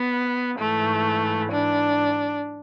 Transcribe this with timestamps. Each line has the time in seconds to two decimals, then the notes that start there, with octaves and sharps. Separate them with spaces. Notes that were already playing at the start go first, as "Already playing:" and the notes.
Already playing: B3
0.57 G#2 E3 A3
1.50 D4